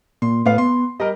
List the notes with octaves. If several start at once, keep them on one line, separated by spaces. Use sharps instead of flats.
A#2 C6
A2 B3 F5
B3 C6
G3 A#4 D#5